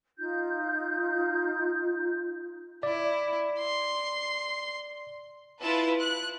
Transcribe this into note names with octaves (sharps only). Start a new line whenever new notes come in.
D#4 F4 G6
E4 D5
C6
E4 F4 B4 A5
F#6